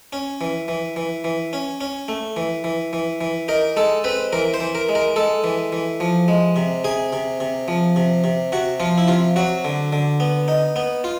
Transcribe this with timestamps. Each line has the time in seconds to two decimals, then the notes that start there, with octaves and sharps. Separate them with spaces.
0.13 C#4
0.41 E3
0.68 E3
0.96 E3
1.24 E3
1.53 C#4
1.81 C#4
2.08 A3
2.37 E3
2.64 E3
2.93 E3
3.21 E3
3.48 D#4 A#4
3.77 G#3 A4
4.04 C4 B4
4.33 E3 A#4
4.54 C5
4.60 E3
4.75 A#4
4.89 G#3
4.95 A#4
5.16 G#3 A4
5.44 E3
5.72 E3
6.00 F3
6.28 G#3
6.56 C3
6.84 C3 G#4
7.13 C3
7.40 C3
7.68 F3
7.96 C3
8.24 C3
8.52 C3 F#4
8.80 F3 F4
8.98 E4
9.08 C3 F4
9.36 F#3 F#4
9.65 D3
9.93 D3
10.20 B3
10.48 D#4
10.76 B3
11.04 F4